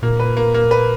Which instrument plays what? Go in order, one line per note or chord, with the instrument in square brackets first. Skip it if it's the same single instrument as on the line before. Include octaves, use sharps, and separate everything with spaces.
[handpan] A#2 [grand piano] A#3
[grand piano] B4
A#3
A#3
B4